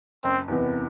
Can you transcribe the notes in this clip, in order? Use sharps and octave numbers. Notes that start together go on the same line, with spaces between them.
F#1 C4
E2 C3 E3 B3